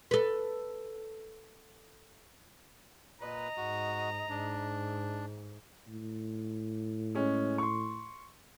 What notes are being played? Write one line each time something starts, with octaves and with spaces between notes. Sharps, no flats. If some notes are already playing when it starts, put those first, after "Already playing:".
A4 B4
A#2 B4 D#5 A#5
G#2 F#4
G#2 D4
A2
G#3 C#4 G#4
C6 C#6